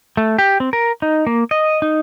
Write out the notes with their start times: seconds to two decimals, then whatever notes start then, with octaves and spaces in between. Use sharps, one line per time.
0.17 A3
0.38 G4
0.60 C4
0.73 A#4
1.02 D#4
1.27 A#3
1.51 D#5
1.82 D#4